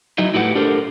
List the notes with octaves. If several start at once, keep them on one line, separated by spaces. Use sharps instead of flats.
F#3 D#4 E4
A2 E4 F#4 G4 B4 F#5
D4 G4 A4 A#4 C5